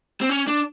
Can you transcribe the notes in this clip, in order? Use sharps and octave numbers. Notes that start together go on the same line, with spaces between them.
C4
C#4
D4